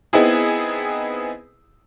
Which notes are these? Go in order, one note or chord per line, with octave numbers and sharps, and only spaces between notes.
B3 C4 D#4 E4 G#4